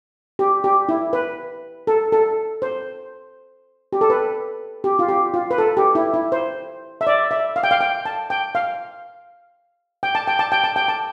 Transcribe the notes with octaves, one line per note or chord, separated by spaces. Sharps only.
G4
G4
E4
B4
A4
A4
C5
G4
A4
B4
G4
F4
G4
F4
B4
A4
G4
E4
E4
C5
E5
D5
E5
F5
G5
F5
G5
A5
G5
F5
G5
A5
G5
A5
G5
A5
G5
A5